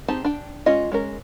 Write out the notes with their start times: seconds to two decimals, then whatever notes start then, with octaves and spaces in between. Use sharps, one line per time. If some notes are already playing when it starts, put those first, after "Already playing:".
0.08 C4 D#4 G4 G#4 A5
0.25 D4 G5
0.66 G#3 C#4 F4 D#5
0.92 G#3 C#4 A#4